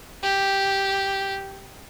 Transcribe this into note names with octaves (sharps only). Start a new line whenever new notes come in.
G4